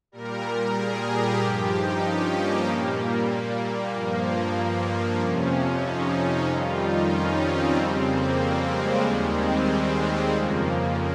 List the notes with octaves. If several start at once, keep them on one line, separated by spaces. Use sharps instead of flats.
A#2 G3 A#4
G#4
G4
G2 F3
D#4
C#4
A#3
A#2 G3 A#3
A#3
G2 F3 A#3
A#3
A#3
F2 C3 F3 C#4
D#4
F2 D#3 G3 F4
D#4
C#4
C4
F2 C#3 G3
A#3
A#3
G#3
D#2 D#3 G3
C4
F2 C#3 F3 A#3